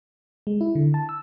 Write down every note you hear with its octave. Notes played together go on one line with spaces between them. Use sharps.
G#3
E4
D3
A5
E6